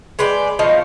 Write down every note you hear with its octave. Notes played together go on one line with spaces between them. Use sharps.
G#3 B4 D5 G5
B2 F3 D#4 F5